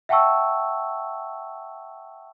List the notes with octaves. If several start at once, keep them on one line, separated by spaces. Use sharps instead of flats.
E5 F#5 G5 A5 C#6 E6